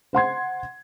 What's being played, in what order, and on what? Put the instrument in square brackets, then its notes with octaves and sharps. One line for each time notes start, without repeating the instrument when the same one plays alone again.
[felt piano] C5 F#5 C6 G#6